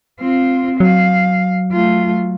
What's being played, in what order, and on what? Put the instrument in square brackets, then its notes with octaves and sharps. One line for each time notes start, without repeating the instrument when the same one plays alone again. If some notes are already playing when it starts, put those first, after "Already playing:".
[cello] C4 F4
[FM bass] F#3 [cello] F5
[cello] A3 F4